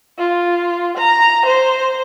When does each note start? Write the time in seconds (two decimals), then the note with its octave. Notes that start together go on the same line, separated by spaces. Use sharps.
0.18 F4
0.97 A#5
1.46 C5